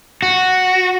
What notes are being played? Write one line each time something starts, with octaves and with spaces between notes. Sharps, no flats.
F#4